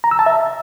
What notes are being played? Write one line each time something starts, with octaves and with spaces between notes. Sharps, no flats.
A#5
E6
A5
E5